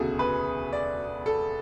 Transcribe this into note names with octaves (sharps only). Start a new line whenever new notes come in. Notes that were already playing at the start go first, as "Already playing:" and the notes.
Already playing: E1 D2 C#3 F#4 G#4 A4
B4
D5
A4